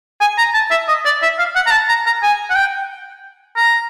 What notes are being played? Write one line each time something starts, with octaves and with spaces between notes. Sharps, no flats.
G#5
A#5
A5
E5
D#5
D5
E5
F5
F#5
A#5
A5
A#5
A#5
G#5
F#5
G5
A#5